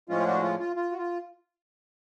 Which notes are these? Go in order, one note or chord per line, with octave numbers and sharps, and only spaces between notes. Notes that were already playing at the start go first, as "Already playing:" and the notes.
A2 F3 G#3 C#4 F4
G#4
D4 F#4
F4
F4
F4
F#4
F4